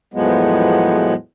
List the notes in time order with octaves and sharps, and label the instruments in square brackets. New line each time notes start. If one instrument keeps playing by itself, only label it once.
[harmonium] E2 A2 F3 F#3 G#3 B3